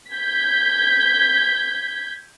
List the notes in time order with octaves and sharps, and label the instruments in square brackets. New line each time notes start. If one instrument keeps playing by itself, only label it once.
[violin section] G6 G#6 B6